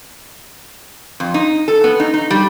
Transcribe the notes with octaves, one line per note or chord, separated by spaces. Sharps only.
F2
D#4
A4
B3
D#4
D#4
G3